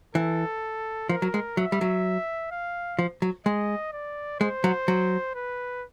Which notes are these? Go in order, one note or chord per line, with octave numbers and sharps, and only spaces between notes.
E3 A4
F3 A#4
F#3
G#3
F#3 E5
G3
F#3
F5
F3
F#3
G#3 D#5
D5
G#3 C5
F#3
F#3
B4